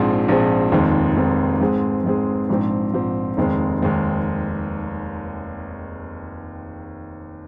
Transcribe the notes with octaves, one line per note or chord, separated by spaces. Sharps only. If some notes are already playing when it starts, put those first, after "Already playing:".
Already playing: A#1 G#2 F3 C4 G#4
A#1 G#2 F3 C4 G#4
F1 D#2 D#3 G#3 C4
F1 D#2 D#3 G#3 C4
G#2 G#3 C4 G#4
G#2 G#3 C4 G#4
A#1 G#2 F3 C4
A#1 G#2 F3 C4
F1 D#2 D#3 G#3 C4
F1 D#2 D#3 G#3 C4